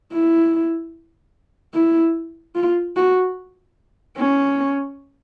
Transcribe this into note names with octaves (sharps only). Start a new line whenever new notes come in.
E4
E4
F4
F#4
C#4